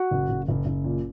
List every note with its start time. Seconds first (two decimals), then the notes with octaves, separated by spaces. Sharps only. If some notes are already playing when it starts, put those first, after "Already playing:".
Already playing: F#4
0.11 F#1
0.29 F#1
0.48 F#1
0.66 F#1
0.84 A#2